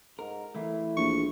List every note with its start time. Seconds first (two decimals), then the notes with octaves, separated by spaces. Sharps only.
0.19 G#2 A#4
0.55 E3 A3 E4
0.97 A#1 C#6